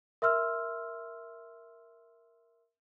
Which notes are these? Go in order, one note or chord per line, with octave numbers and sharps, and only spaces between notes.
A#4 E5 C6 E6 F6